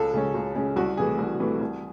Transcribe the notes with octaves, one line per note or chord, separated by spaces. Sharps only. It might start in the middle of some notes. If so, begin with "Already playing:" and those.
Already playing: C#2 A4
C#3 G#3 C#4
C#2
C#3 G#3 C#4
C2 F#4
C3 E3 A3 G#4
C2
C3 E3 A3
C2